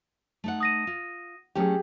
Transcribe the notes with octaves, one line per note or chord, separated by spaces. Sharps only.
A3 D#4 F#5
D#6 A#6 D#7
F4
F#3 A3 C#4 G4 G#4